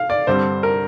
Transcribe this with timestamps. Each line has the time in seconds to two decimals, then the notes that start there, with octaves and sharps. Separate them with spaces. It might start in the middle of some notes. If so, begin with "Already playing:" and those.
Already playing: F5
0.10 D5
0.27 G2 D3 G3 C4 C5
0.63 A#4